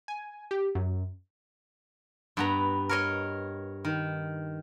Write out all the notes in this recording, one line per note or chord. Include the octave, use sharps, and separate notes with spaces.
G#5
G4
F#2
G2 B3 A#5
A#4 C#5 D#5
D#3